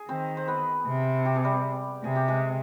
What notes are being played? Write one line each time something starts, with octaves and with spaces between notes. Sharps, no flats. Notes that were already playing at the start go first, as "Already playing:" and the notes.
Already playing: G#4
D#3 C4 C5
C5
B3 B4
C3
G4
G#4
G3 G4
C3 G#4
G4
G#3 G#4